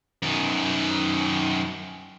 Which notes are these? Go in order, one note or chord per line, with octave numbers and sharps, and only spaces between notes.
F#2 D#3